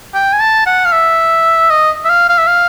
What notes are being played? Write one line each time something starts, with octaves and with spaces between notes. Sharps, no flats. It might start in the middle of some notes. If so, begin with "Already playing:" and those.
G5
G#5
A5
F#5
F5
E5
D#5
E5
F5
F5
E5
F5